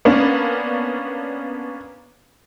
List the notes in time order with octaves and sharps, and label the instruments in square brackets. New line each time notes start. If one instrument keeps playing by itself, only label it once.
[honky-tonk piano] A#3 B3 C#4 D4